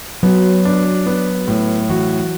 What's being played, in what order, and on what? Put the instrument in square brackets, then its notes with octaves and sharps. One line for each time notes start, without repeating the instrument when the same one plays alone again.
[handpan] F#3 [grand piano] B3
[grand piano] D4
B3
A2
[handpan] E3 [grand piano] F#4